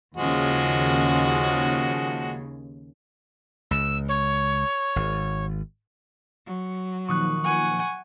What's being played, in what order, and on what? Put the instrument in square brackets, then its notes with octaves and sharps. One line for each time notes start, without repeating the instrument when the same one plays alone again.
[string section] D#2 C#3 [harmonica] F3 G#3 F#4
[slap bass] C#2 [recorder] E6
[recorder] C#5
[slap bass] G#1
[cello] F#3
[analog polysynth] A#2 D#3 F3 [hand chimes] C#6 D#6 F#6
[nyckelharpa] F#5 G#5 [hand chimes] C#6